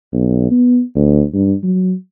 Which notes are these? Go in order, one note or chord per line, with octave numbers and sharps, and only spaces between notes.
B1
B3
D2
G2
F#3